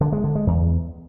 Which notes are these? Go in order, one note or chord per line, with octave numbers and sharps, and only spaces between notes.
D3
G#3
D3
G#3
E2